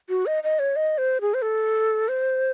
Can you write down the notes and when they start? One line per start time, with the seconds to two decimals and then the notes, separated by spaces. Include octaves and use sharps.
0.09 F#4
0.26 D#5
0.44 D#5
0.59 C#5
0.76 D#5
0.98 C5
1.21 G#4
1.34 C5
1.42 A4
2.08 C5